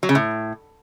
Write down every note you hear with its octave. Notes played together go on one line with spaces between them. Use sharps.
F#3
C#3
A2